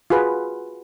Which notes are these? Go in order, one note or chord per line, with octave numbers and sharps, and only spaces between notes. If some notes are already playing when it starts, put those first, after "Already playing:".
F4 F#4 G#4 B4